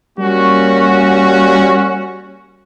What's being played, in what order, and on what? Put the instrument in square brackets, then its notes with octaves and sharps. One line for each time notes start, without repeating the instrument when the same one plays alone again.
[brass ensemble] G3 A#3 C#4 F#4